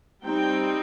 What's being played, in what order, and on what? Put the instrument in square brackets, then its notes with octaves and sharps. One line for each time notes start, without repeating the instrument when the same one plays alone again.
[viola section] G3 C4 D#4 G5